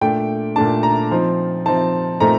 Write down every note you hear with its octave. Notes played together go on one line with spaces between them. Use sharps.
A#2 A3 D4 G5
A#2 A3 D4 A5
A#5
F3 C4 D#4
F3 C4 D#4 A5
A#2 A3 C4 D#4 A#5